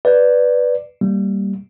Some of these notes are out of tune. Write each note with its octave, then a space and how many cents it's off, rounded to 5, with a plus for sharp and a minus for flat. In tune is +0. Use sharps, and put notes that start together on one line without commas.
B4 +0 D5 +0
G3 -5 A#3 -15